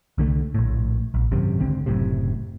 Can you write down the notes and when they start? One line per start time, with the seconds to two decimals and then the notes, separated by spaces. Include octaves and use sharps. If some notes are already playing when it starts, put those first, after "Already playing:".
0.18 C2 D3 G#3 A3
0.54 A#1 A2
1.14 A#1
1.31 G#1 F#2 C3
1.60 C#2 D3 C4
1.86 F#1 F#2 A2 C3